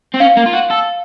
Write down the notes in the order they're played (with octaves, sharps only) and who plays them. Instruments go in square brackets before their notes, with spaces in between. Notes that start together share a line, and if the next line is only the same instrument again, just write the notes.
[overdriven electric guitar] C4
[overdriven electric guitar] C#4 [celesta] F5
[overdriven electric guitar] A#3
F4
F#4
A4